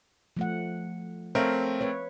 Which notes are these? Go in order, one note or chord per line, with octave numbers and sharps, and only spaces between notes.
F3 A3 F#5
A3 C4 A#4 C#5 E5 F5
B4 C#5